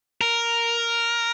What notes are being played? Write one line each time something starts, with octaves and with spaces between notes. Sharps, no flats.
A#4